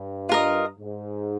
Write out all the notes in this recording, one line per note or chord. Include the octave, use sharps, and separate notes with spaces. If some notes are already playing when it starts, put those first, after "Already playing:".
Already playing: G2
F4 A#4 D#5
G#2